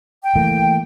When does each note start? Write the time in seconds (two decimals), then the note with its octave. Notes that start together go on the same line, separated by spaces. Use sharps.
0.22 G5
0.35 E3 A3 A#3